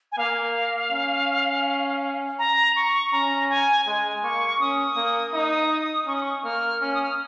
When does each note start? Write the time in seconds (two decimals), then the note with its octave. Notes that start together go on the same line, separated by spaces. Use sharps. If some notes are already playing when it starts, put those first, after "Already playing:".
0.12 G#5
0.18 A#3 F5
0.92 C#4
2.39 A#5
2.76 C#6
3.12 C#4 A#5
3.50 G#5
3.86 G#3 G#5
4.23 A#3 C#6
4.60 C#4 D#6
4.97 A#3
5.33 D#4 D#6
6.07 C#4 C#6
6.16 D#6
6.23 C#6
6.44 A#3 F6
6.81 C#4
6.89 F6
6.95 D#6
7.03 F6